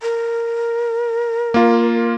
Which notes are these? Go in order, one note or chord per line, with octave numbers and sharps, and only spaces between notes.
A#4
A#3 F4